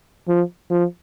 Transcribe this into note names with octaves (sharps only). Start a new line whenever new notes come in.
F3
F3